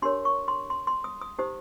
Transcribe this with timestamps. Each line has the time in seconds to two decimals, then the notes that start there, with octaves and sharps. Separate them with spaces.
0.02 D4 G4 A#4 C#5 C6
0.25 C#6
0.48 C6
0.70 C6
0.87 C6
1.04 D#6
1.21 D#6
1.39 D#4 G4 C5 D#6